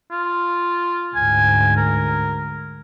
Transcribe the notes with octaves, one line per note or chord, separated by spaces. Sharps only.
F4
D2 G#2 G#5
A#4